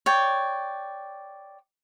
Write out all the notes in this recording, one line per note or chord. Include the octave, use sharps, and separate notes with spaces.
C#5 D5 G5